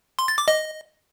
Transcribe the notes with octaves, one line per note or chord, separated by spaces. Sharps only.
C6
A6
D6
D#5